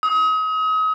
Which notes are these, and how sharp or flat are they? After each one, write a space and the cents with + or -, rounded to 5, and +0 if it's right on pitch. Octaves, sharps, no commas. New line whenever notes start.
D#6 +35